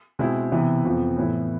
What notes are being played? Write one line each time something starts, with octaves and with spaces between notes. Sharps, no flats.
B2 G#3 C4 E4
C3 E3 B3 E4
F2 C3 F3 B3
A2 E3 B3 E4